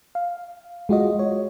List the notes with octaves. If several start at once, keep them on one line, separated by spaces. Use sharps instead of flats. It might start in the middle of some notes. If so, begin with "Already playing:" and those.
F5
G#3 F4 F#4 D#5
C#5